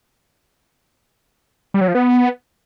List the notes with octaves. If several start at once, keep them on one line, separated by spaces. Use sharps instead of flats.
G3
F#3
F3
B3